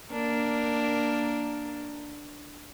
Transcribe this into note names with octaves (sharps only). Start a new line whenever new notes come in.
A#3 D4 A#4